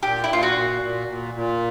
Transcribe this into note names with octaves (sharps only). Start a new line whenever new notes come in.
A#2 G4
E4
A#2 F4
F#4
A#2
A#2
A#2
A#2